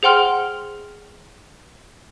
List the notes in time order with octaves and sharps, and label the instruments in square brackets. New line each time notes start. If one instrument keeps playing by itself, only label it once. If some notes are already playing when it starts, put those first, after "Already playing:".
[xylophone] G#4 C5 F#5 G5 C6 F6